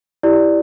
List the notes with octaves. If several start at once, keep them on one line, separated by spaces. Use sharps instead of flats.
E4 G4 D5